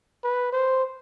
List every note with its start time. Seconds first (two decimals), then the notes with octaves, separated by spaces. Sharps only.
0.24 B4
0.53 C5